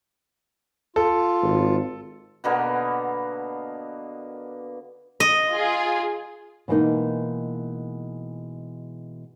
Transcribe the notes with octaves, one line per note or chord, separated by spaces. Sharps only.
F4 A4
G#1
B2 D3 A#3 B3
D#5
F4 G#4
B2 E3 G#3 A#3 D4 D#4